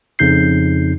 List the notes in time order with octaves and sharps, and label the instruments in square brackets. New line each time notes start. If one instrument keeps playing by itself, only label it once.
[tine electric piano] F2 C#3 D#4 G6 C7